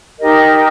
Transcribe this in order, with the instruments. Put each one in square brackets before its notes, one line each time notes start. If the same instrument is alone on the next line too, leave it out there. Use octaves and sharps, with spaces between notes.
[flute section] D#4 G4 A#4 D#5